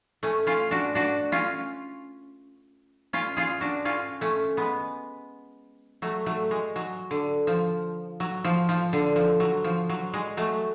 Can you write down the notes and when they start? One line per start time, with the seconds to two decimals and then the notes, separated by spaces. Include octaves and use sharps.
0.23 A3 C#4
0.47 C#4 F4
0.71 D4 F#4
0.95 D4 F#4
1.32 C#4 F4
3.13 C#4 F4
3.37 F4 G#4
3.61 D4 F#4
3.85 C#4 F4
4.21 A3 C#4
4.57 G#3 B3
6.02 F#3 A3
6.26 F#3 A3
6.51 G#3
6.76 F#3
7.11 D3
7.47 F3
8.20 F#3
8.44 F3
8.69 F3
8.93 D3
9.16 F3
9.40 F#3
9.64 F3
9.89 F#3
10.14 G#3
10.37 F#3 A3